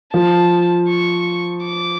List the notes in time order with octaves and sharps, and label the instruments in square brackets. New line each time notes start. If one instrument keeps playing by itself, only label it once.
[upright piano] F3 [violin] A5
[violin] C#6
D6